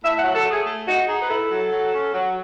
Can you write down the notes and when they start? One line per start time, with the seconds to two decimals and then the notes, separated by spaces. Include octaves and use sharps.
0.03 A2 E5
0.19 F#3 F#5
0.35 A4
0.45 A3
0.51 G#4
0.66 A3
0.87 D#4 F#4
1.08 D#4 G#4
1.21 B4
1.29 E4 A4
1.51 F#3
1.72 F#3
1.93 C#4
2.14 F#3